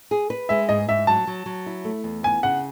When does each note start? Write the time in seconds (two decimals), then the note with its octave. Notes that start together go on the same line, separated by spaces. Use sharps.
0.11 G#4
0.30 B4
0.49 G#3 E5
0.69 G#2 D#5
0.89 G#2 E5
1.07 F#3 A5
1.27 F#3
1.46 F#3
1.66 E4
1.85 A3
2.04 E2
2.23 B3 G#5
2.43 C#3 F#5